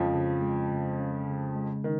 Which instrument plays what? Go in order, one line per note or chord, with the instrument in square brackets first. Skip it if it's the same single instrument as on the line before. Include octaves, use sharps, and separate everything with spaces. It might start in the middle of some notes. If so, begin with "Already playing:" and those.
Already playing: [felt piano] F2 F3 [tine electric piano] C#3 G#3 C#4
[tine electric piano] C#3
G#3
C#3
C#4
C#3
G#3
[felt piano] D#3